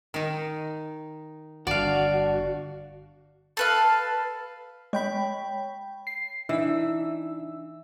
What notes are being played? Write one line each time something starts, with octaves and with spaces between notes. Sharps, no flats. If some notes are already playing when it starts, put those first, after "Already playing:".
D#3 D#4
G1 D3 D4 F#4 D5 F5
A4 B4 F5
G#3 C#5 G5 B5
C7
E3 D4 D#4 E5 E6